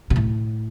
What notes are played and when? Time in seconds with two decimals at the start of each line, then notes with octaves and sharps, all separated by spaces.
0.10 B2
0.16 A2